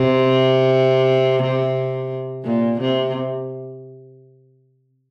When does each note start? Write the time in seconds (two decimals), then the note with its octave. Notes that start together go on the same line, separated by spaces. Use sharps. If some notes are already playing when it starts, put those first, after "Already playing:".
Already playing: C3
2.44 A#2
2.81 C3